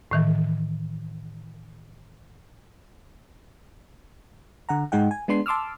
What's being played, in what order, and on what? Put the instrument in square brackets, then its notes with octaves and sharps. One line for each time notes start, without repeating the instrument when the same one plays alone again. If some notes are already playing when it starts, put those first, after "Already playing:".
[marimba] A2 D#3 E3
[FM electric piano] D3 F#5 A#5
G#2 G#3 D#4 F#5 G5
G#5
G#3 B3 D4 C6 C7
A5 C6 D6 E6 F6